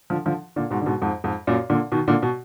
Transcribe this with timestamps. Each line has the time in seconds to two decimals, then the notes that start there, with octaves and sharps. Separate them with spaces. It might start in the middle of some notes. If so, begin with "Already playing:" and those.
0.10 D3 F3
0.26 D3 F3
0.56 A#2 D3
0.71 G#2 B2
0.81 D3
0.86 G#2 B2
1.02 F2 G#2
1.24 F2 G#2
1.47 F#2 A#2
1.70 A#2 D3
1.92 B2 D#3
2.08 A#2 D3
2.23 B2